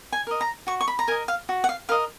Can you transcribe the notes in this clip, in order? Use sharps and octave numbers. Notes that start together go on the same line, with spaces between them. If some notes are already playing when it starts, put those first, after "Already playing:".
G#5
A#4 D#5
A#5
F#4 C#6
C#6
B5
A#5
A#4 D#5 G#5
F5
F#4
F#5
F5
A#4 D#5 F5